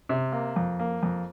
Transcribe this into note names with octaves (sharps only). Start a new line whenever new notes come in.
C3
A#3
F2
A#3
F2